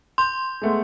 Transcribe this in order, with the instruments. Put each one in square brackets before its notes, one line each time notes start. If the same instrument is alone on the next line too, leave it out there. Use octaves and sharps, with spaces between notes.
[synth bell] C6 [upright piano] G6
[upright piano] G#3 A3 B3